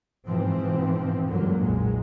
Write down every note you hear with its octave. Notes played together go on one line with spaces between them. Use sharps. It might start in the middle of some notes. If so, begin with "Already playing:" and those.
G#2 B2 E3 F3 C4
C#2 G2 D3 F#3 G3 A#3
B1 F2 A#2 G#3